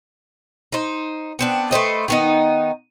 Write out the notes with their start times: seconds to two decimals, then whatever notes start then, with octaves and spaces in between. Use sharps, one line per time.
0.72 D#4 C5
1.39 B3 C4 D4
1.71 A3 B4 C5 D#5
2.08 D#3 B3 D#4